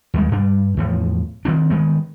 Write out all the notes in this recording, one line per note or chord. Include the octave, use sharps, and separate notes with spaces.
D#2 G3 G#3
G2 G3 D4
E2 A2 F3
D#3 C4 D4
D#3 G#3 B3